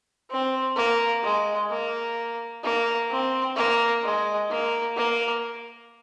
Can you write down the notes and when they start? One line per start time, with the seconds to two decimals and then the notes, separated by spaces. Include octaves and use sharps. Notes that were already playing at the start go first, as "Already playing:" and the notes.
0.30 C4
0.76 A#3
1.23 G#3
1.70 A#3
2.63 A#3
3.10 C4
3.56 A#3
4.03 G#3
4.50 A#3
4.96 A#3